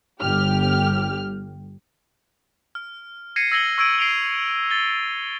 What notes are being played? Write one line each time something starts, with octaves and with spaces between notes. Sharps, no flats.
G1 G4 F6
F6
G#6 A#6 C7 C#7 D#7
E6 G#6 A#6 C#7 F#7 G7
C#6 E6 G#6 D7 D#7
C7 D7 F7 G7
A6 G7